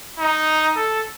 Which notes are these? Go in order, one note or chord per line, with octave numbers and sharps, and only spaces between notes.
D#4
A4